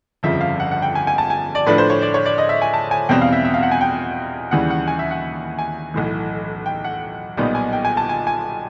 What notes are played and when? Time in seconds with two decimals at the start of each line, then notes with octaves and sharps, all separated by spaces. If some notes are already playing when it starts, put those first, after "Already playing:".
0.23 G1 F2 C#3 F3 E5
0.41 F5
0.60 F#5
0.71 F#5
0.82 G5
0.95 G#5
1.07 G#5
1.18 A5
1.30 G#5
1.55 D5
1.66 A2 F3 A3 D4 B4
1.78 C5
1.90 C#5
2.02 D5
2.14 C#5
2.26 D5
2.38 D#5
2.49 E5
2.62 G#5
2.73 A5
2.91 G#5
3.09 E2 B2 G3 C4 G5
3.21 F5
3.32 E5
3.45 E5
3.54 F5
3.63 F#5
3.72 G#5
3.81 G5
4.51 D#2 C#3 E3 G3 F#5
4.70 F#5
4.88 G#5
4.99 E5
5.11 F#5
5.59 G#5
5.94 B1 A2 E3
6.66 G5
6.84 F#5
7.37 B1 A#2 G3 B3 D#4
7.55 G#5
7.73 G5
7.85 G#5
7.97 A5
8.09 G#5
8.27 G#5